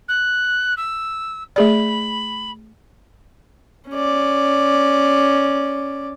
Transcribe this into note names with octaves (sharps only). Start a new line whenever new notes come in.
F#6
E6
A3 G#4 D5 B5
C#4 D5